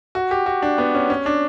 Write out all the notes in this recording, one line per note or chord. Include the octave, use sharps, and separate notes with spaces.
F#4
G4
F#4
D4
B3
C#4
C#4
D4